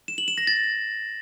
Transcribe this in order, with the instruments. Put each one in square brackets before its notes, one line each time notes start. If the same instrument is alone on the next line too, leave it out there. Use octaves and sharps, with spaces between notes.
[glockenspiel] E7
F#7
E7
A#6
A6